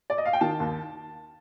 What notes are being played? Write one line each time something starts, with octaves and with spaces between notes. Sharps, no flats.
D5
D#5
F5
G5
D#3 A5
D#2